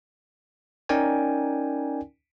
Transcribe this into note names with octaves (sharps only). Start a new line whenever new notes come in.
C#4 D#4 A#4 D5 G5 G#5